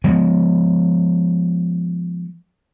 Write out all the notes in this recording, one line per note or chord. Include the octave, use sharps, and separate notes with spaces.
F3 G#3 B3